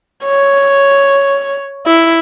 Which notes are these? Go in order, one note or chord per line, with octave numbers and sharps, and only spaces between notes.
C#5
E4